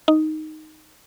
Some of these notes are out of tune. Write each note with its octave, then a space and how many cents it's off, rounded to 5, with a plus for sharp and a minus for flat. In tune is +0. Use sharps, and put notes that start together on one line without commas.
D#4 +0